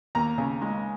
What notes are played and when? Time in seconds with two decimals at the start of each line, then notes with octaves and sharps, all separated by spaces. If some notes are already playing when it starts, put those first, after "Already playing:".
0.15 D#2 A#5
0.38 C#3
0.61 G#3